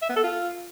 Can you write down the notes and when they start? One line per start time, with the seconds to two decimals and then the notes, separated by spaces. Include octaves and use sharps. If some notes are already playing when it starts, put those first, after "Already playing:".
0.02 E5
0.09 B3
0.17 A4
0.24 F4